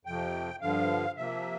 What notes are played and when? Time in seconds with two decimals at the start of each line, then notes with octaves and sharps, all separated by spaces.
0.05 F2 C3 F3 G5
0.61 G2 D3 F3 F5
1.17 C3 F3 A#3 E5